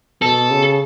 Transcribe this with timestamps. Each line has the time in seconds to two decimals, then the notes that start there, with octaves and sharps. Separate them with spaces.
0.22 B2 A4
0.50 C#3